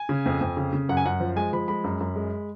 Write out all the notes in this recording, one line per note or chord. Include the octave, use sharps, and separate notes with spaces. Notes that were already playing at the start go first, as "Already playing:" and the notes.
Already playing: G#5
C#3
F2
F2
C#3
C#3
F#2 F#5
G#5
F#2 F#5
F3
G#3 G#5
F3 B5
G#3 B5
F#2
F#2
G#3